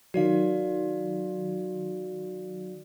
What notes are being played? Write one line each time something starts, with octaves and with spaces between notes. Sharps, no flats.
D#3 F#3 F#4 D5 F5